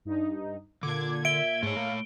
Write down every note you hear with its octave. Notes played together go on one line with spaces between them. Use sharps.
G2 D#4
A#2 D3 D6 G#6
E5 D7 G7
G#2 A3 C#5
A#3